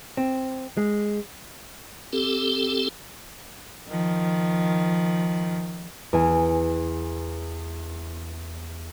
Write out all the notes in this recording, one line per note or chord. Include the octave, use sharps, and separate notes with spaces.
C4
G#3
C4 G4 A4
D#3 F3
E2 G#5